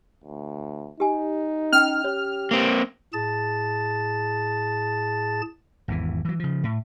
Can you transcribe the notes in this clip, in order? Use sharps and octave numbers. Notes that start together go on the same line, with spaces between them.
D2
D#4 G4 G#5
C#4 G5 F6
G4 C#5
A#3 C4
A2 G#4 A5 A6
G#1 E2 E3
E3 F#3
C#3 F3
A2